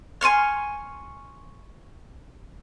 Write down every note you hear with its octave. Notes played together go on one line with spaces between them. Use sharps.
G#5 C6 C#6 F6